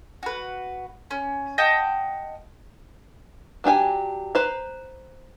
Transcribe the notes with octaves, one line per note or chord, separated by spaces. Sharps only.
F#4 B4
C#4
D#5 F#5 G5 A5
F#3 D4 G4 G#5
B4 C5 A#5